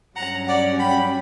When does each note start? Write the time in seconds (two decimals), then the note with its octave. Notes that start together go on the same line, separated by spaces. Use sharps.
0.16 G2 F#3 C#4 F#5 A#5
0.48 D5 F#5
0.80 G5 B5